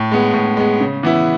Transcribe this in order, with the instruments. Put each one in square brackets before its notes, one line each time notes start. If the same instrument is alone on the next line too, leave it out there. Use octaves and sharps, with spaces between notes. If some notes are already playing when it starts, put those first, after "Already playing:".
Already playing: [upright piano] A2
G#3 B3
A2
G#3 B3
C#3
E3 B3 E4